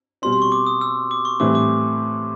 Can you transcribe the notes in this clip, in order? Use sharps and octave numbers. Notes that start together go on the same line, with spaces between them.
B2 G3 C4 C6
C6
C#6
D6
D#6
E6
D6
C#6
A2 E3 G3 C4 D6
D6